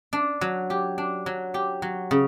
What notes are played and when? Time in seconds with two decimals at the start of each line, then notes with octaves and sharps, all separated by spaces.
0.13 D4
0.41 F#3
0.70 G4
0.98 D4
1.26 F#3
1.54 G4
1.82 F#3
2.11 C#3